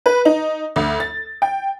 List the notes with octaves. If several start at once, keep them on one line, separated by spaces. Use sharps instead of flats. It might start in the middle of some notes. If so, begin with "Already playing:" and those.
B4
D#4
D2
A6
G5